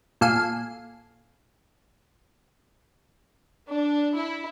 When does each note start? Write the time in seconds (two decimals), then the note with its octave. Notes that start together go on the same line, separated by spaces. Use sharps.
0.21 A#2 A4 F5 G#5 C7
3.68 D4
4.16 E4